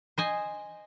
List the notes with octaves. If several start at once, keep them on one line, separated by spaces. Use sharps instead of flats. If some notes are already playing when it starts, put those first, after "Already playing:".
C5 D#5 G#5